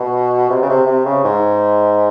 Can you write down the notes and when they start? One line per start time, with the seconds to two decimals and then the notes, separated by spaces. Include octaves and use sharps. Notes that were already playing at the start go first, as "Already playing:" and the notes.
Already playing: B2
0.50 C3
0.62 C#3
0.69 C3
0.87 C3
1.05 C#3
1.24 G#2